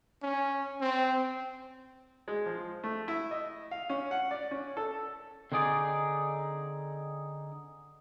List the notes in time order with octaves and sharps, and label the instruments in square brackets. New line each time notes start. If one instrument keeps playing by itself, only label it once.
[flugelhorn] C#4
C4
[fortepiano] G#3
F3
A3
E4
D#5
F5
C#4
F#5
D5
C#4
A4
[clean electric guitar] D3 C4 D#4 G#4 D5